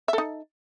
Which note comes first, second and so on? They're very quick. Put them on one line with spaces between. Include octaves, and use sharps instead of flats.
E5 A4 D#4